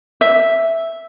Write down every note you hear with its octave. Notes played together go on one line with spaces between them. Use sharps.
E5